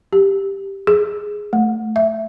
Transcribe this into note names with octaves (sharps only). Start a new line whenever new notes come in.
G4
G#4
A3
E5